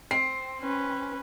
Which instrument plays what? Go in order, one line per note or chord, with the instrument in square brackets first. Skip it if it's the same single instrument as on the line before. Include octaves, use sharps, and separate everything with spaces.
[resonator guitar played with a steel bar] C4 [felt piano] C7
[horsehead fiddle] C#4 B4